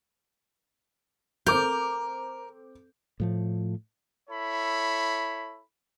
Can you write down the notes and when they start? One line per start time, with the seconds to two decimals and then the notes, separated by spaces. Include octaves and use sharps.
1.46 C4 A#4 D6 G6
3.20 A2 F3 A3
4.29 E4 A4 C#5 B5